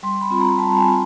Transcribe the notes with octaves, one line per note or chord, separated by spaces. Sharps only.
G3 C6
B5
C4 F4
A#5
G3 A5
G#5
C4 F4